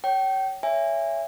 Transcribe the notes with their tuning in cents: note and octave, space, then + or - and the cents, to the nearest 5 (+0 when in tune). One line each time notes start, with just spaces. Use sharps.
C#5 +0 G5 -35
C#5 +15 E5 +15 G#5 -25